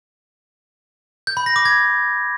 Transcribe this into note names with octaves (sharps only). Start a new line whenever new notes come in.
G6
B5
A#6
D6
G#6